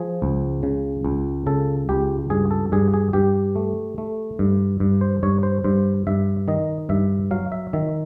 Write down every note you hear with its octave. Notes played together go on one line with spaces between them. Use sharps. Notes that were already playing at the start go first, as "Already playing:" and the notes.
Already playing: F3 G#4
C#2
C#3
C#2
C#3 A4
C#2 G4
G2 G#4
A4
G2 G#4
G#4
G2 G4
A3
A3
G2
G2
C5
G2 C#5
C5
G2 C5
G2 E5
D#3 D#5
G2 E5
F#3 F5
E5
D#3 E5